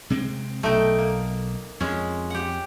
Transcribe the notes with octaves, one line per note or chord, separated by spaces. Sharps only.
C3 G#3 C4
B1 A3 D#4 G5
A#3
F2 G#3 C#4
G4 F#5